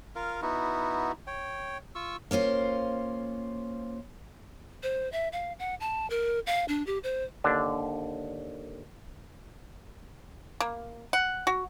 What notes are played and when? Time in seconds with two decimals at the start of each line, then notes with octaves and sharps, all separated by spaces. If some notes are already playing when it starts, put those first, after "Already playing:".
0.16 F4 A#4 F5
0.42 B3 D#4 E4 F#4
1.27 C#5 G5
1.95 F4 C#6 E6
2.31 A#3 C#4 F4 C5
4.83 C5
5.12 E5
5.32 F5
5.59 F#5
5.80 A5
6.10 A#4
6.47 F5
6.68 D4
6.86 G4
7.04 C5
7.44 D#2 D3 D4
10.61 A#3
11.13 F#5
11.47 F#4